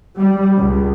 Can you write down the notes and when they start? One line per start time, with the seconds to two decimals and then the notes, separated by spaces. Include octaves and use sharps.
0.16 G3
0.57 C#2